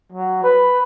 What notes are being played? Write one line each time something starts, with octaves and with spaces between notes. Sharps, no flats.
F#3
B4